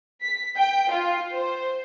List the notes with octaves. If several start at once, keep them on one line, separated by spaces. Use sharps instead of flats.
B6
G5
F4
C5